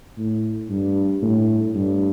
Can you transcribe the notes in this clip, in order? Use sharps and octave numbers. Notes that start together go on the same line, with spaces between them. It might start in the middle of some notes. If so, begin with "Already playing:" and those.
A2
G2
A2
G2